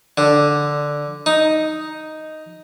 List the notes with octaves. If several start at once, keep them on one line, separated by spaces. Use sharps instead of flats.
D3
D#4